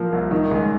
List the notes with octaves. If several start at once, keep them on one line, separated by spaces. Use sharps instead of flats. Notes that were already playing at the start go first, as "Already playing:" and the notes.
Already playing: A#2 F3 A#3
C2
D#3
C#2